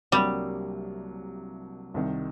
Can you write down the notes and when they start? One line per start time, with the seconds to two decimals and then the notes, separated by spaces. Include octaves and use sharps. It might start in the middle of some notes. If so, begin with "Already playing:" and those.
0.12 C2 C3 F#3 G3 A#3 D4
1.94 C2 C3 D#3